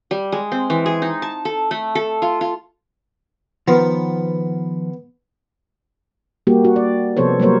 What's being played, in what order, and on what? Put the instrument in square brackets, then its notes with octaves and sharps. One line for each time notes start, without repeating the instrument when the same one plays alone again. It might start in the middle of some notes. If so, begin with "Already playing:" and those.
[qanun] G3
G#3
C4
E3
G#4
D#4
A5
A4
A3
A4
F4
F4
[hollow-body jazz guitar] D#3 F3 [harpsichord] B3
[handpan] G3 A#3 F#4 G4
F#4
D5
C3 F3 B3 A4 C5 C#5
F#3 G3 A#3 A#4 C5 C#5